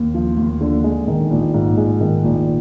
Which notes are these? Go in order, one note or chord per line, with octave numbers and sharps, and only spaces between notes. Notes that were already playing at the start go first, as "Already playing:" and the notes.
Already playing: D#2
F3
D#2
D3
G#3
D#3
A#1
G#2
G#3
D#3
A#1